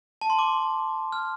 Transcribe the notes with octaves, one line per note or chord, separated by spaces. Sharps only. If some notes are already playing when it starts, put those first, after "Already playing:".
A5
C6
D6
F6